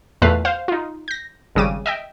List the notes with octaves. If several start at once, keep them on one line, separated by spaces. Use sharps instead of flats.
E2 A#2 A3 B4 F5
C5 F5
D#4 F4
G6 A#6
G#1 C#3 G3 D6 D#7
D#5 E5 G5